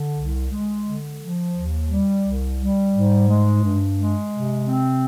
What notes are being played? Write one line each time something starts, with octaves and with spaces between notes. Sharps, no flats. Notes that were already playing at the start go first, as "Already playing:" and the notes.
Already playing: D3
C2
G#3
D3
F3
D#2
G3
C2
G3
G#2
G#3
G2
G#3
C3
C4